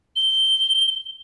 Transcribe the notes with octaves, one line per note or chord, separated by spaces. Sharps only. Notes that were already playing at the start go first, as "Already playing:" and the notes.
G7